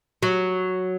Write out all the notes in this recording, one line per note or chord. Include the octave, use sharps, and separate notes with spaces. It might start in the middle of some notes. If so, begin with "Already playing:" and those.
F#3